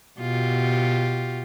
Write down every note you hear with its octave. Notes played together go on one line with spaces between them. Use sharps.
B2 F4 G4